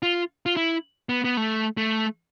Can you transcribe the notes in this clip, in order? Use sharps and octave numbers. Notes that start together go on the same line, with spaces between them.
F4
F4
E4
B3
B3
A3
A3